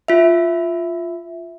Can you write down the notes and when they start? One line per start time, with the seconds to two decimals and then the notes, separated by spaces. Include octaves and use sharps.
0.08 F4 E5